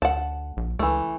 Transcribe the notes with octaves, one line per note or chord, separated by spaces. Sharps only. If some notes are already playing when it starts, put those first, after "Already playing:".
D2 F#5 A5
A#1
C#2 E3 A3